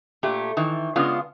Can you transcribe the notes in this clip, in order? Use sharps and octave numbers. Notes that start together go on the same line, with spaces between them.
A#2 A3 G4
D#3 E3
C#3 G#3 B3 D4 F4